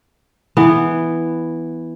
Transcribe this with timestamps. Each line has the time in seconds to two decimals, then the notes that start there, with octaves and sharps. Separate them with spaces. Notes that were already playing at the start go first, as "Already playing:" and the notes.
0.57 E3 B3